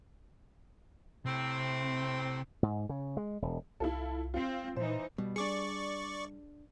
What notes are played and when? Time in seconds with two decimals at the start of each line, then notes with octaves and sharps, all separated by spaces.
1.26 A2 C3 C4
2.63 G#2
2.89 C#3
3.17 G#3
3.42 E1
3.80 C2 E4 F4 A4
4.34 C4 F4
4.77 A#2 E3 D#4 C5
5.18 B2 G3
5.36 D4 G#4 D5 C#6